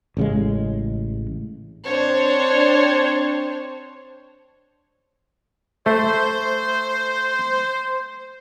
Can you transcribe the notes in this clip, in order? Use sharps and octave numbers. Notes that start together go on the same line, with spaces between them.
A1 C#3 G#3
C4 D4 C5 C#5
A3 C5